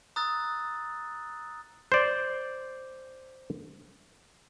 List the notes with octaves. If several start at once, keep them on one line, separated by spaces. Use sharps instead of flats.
A#5 D#6 E6 F#6 A6
C5 D5